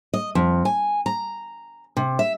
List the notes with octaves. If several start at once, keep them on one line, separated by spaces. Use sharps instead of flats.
D#5
F2
G#5
A#5
C3
E5